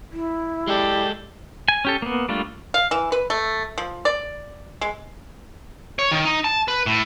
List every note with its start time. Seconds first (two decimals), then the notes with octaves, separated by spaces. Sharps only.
0.12 E4
0.67 G#3 G4 A4 D5
1.68 G#5
1.85 C#4 G4 A4
2.02 A#3 B3
2.29 G3 A3 A#3 D4 F4
2.74 F5
2.91 E3
3.12 B4
3.30 A3
3.78 F3
4.05 D5
4.81 G#3
5.99 C#5
6.12 D#3
6.25 D#4
6.44 A5
6.68 B4
6.86 A2